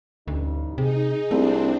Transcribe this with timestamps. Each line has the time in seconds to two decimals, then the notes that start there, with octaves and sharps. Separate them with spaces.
0.28 A1 D2 G2 D#4
0.78 C3 D#4 G#4
1.31 C2 A3 C4 D4